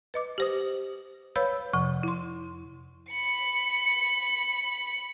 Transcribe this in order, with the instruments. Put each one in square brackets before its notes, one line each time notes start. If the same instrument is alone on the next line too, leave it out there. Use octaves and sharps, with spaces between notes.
[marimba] B4 D#5 D6
G4 C5 D#6
B4 C#5 F5 B5 E6 G6
F2 C3 F3
E4 C6
[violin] B5 C#7